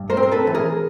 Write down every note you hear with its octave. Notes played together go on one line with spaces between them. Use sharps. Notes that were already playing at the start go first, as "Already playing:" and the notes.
Already playing: G2
A#4 C5
C4
A#4
A4 B4
E3
G#4 A#4